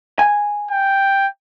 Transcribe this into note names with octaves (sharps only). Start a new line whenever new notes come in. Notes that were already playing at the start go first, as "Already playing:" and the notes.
G#5
G5